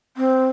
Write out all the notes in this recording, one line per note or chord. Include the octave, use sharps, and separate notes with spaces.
C4